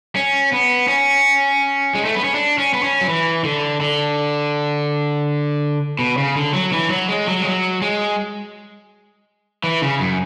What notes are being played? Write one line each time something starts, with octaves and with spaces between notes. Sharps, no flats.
C#4
B3
C#4
G#3
A3
B3
C#4
D4
C#4
B3
C#4
F#3
E3
D3
D3
B2
C#3
D3
F#3
E3
F#3
G#3
F#3
G#3
F#3
G#3
E3
C#3
F#2